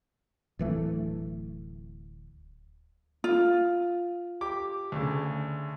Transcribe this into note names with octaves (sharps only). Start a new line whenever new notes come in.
D1 E3 A3
F4
G4 D6
D2 C#3